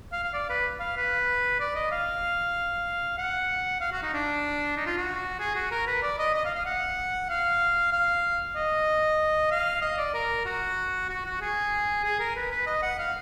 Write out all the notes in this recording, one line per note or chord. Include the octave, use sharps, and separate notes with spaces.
F5
F5
D5
B4
F5
B4
D5
D#5
F5
F#5
F5
F#4
D#4
D4
D#4
F4
F#4
G#4
F#4
A#4
B4
D5
D#5
D#5
F5
F5
F#5
F5
F5
D#5
F5
D#5
D5
A#4
F#4
F#4
F#4
G#4
G#4
A#4
B4
B4
D#5
F#5
F5